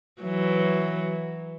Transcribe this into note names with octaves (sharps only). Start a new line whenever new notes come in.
E3 F#3